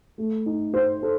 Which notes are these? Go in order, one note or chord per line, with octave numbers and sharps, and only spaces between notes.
A3
D#4
C5
A4